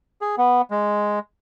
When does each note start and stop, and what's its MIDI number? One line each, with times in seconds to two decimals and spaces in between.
0.21 0.35 68
0.38 0.62 59
0.71 1.19 56